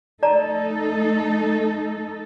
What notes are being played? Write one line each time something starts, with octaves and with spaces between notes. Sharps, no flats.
A3 D#4 A4 D5 A5 A#5